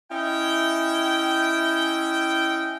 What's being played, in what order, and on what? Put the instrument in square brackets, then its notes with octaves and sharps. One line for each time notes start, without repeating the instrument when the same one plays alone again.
[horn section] C#4 E4 D#5 G5